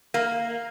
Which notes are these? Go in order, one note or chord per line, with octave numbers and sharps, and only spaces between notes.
A#3